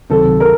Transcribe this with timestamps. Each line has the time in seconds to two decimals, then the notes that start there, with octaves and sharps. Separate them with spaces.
0.10 C#2 C3 D#3 F#3 C4 A4
0.40 A#4